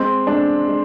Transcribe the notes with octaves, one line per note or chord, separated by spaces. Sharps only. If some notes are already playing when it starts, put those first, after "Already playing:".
Already playing: G#3 C4
G#3 D4
G#3